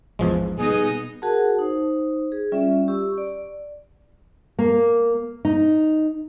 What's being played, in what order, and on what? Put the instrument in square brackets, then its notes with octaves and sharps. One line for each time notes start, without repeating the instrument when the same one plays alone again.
[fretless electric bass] A1 G#2 [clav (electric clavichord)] E2 F3 G#3
[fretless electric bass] B2 G3 [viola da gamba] B3 D#4 D#5 [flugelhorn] G#4
[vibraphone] F#4 G#4 A#4 F#5 A5
D#4 C5
G#4
G3 C#4 F4 D5 E5
G4 C#6 E6
D5
[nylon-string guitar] A#3
D#4